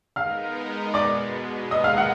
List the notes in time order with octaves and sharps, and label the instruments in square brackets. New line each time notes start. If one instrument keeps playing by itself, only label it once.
[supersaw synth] G#3 B3 D#4 A#4 [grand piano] F5 F6
[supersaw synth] B2 G#3 B3 [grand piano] D5 D6
[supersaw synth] G#3 B3 D#4 A#4 [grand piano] D#5 D#6
[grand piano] F5 F6
F#5 F#6